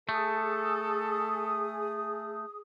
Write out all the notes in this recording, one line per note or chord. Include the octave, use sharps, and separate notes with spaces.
A3 G#4 A4 D#6